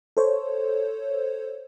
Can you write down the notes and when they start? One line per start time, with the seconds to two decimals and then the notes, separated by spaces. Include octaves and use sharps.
0.17 A4 C5 C#5